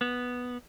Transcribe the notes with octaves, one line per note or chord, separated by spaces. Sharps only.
B3